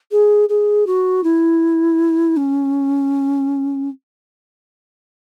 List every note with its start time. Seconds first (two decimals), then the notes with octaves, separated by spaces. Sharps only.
0.11 G#4
0.49 G#4
0.86 F#4
1.23 E4
2.36 C#4